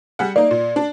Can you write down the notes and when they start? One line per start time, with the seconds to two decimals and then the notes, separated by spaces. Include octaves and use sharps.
0.19 G3 G#4 F#5
0.36 A#3 D#4 D5
0.51 A#2
0.76 D4